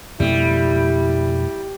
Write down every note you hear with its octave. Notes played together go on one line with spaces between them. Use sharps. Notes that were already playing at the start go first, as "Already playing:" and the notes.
F2 B2 G3 A3 E4